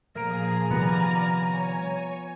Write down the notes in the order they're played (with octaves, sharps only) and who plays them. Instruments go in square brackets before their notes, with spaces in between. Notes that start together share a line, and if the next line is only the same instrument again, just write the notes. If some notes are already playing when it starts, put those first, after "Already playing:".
[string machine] A#2 F3 G#4 [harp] A#3 A#6 D7 [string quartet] A#5
[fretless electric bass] C3 D#3 G3 [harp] F3 B3 [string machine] D5 G#5 F6
[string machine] C#5 G#5